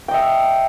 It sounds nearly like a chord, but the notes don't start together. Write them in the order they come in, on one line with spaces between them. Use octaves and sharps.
G5 D#5 E5